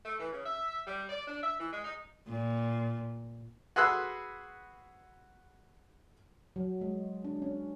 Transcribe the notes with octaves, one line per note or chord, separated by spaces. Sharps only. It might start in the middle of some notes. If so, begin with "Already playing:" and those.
A3
E3
C#3
E5
G3
D5
D4
E5
E3
G#3
D#4
A#2
F#4 G#4 B4 C6 E6 F#6
F#3
G#3
D4
C#4